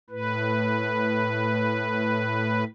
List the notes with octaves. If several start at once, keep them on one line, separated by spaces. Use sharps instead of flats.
A2 B4